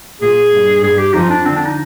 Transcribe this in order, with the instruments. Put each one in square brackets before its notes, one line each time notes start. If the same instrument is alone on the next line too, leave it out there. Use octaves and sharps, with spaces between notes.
[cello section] A#2 A#3 [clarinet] G#4
[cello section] G2 G3
[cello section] G2 G3 [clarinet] G#4
[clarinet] G4
[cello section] F2 F3 [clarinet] D#4
[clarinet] D4
[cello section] D3 [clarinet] C4
[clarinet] D4
D#4